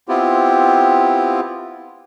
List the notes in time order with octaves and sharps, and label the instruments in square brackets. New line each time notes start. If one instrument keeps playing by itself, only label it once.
[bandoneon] B3 C4 E4 F4 G4